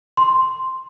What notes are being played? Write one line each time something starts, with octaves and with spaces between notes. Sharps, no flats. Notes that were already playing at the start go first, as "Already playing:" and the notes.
C6